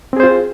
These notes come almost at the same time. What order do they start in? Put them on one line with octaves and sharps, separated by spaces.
C4 G#4 C5 F4